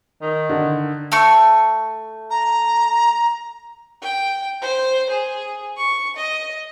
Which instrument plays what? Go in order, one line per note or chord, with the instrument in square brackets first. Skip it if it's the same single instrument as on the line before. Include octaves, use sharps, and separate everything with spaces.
[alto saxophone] D#3
[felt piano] D3
[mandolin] A3 C#6
[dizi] A#5
[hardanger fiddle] G5
C5
G#4
C#6
D#5